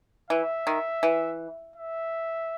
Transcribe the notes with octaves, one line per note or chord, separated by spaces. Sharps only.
E3 E5
D#3
E3
E5